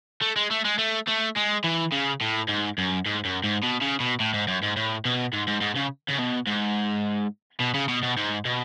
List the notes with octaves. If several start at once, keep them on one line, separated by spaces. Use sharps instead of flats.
A3
G#3
A3
G#3
A3
A3
G#3
E3
C#3
A2
G#2
F#2
G#2
F#2
G#2
B2
C#3
B2
A2
G#2
F#2
G#2
A2
B2
G#2
G#2
G#2
C#3
C#3
B2
G#2
B2
C#3
B2
B2
G#2
B2